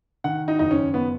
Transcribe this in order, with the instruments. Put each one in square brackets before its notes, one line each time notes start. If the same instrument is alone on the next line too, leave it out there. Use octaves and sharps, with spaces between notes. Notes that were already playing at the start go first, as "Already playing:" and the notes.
[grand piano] D#3 F#5
D#4
F#1 D#4
C#4
B3